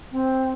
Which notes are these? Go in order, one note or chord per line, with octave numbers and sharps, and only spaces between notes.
C4